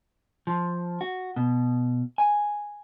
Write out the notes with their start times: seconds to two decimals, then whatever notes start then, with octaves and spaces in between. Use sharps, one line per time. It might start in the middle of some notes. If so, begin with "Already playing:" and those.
0.47 F3
1.01 F#4
1.36 B2
2.18 G#5